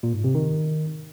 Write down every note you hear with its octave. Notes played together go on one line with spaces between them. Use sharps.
A#2
G#2
C3
D#3